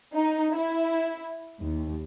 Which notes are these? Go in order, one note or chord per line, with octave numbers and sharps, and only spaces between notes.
D#4
E4
D#2